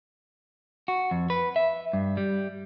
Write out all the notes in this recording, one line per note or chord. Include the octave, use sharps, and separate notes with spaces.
F#4
F2
B4
E5
G2
G3